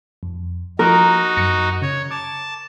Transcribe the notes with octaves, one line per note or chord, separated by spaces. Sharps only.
F2
F3 D#4 F#4 A#4
F#2 A#6 C#7
C#3 C#5
A5 D6